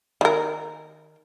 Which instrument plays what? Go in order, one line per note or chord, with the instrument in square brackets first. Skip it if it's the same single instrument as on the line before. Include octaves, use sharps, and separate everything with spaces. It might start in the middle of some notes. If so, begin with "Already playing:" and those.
[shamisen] D#3 A#4